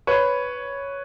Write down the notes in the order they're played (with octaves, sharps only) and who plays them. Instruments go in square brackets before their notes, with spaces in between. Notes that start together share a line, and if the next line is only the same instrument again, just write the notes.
[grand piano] B4 C#5